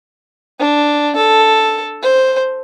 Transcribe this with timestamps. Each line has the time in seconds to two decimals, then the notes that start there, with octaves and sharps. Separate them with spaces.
0.59 D4
1.16 A4
2.02 C5